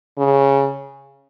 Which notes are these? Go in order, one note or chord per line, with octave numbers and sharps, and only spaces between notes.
C#3